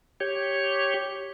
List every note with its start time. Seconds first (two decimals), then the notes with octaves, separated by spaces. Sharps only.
0.20 G4 C#5